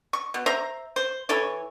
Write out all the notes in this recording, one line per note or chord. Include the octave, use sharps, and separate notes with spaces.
C#6
B2
C5 E5 A#5
C5
E3 E4 A4 C#5